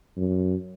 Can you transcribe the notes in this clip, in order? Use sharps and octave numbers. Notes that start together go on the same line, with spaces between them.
F#2